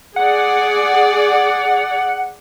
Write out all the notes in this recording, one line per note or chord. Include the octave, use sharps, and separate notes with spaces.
G#4 D5 F#5